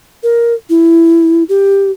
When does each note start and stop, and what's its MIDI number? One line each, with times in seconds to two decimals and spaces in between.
0.23 0.54 70
0.70 1.43 64
1.49 1.91 67